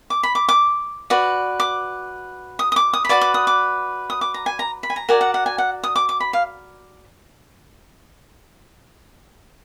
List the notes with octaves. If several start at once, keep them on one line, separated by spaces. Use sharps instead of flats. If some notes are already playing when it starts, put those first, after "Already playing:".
D6
B5
D6
D6
F#4 B4 D5
D6
D#6
D#6
D6
D#6
B5
F#4 B4 D5 D6
D6
D#6
D6
D#6
D6
A#5
G#5
A#5
B5
G#5
A#5
F#4 A#4 D5 G#5
F#5
F#5
G#5
F#5
D#6
D6
D6
B5
F5